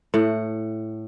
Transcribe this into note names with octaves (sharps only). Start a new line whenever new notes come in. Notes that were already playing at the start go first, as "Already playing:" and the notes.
A2 F#5